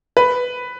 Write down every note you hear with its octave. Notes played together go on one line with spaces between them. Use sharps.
B4